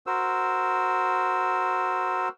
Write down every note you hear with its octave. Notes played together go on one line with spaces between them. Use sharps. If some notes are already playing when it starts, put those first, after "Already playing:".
F#4 A#4 C5 E6